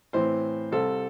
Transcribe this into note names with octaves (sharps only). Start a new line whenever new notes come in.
A2 E3 C4 C5
C2 C3 G3 C4 A4